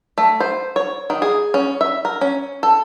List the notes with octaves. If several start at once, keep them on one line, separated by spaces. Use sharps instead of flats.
A3
C5
C#5
D#3
G#4
C#4
E5
A#4
C#4
A4